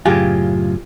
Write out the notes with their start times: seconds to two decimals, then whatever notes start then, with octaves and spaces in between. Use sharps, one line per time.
0.06 F#2 A2 C#3 F4 G4 G#4